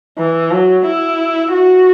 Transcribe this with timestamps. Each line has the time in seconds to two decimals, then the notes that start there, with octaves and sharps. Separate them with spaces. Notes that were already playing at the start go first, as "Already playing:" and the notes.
0.18 E3
0.51 F#3
0.86 E4
1.53 F#4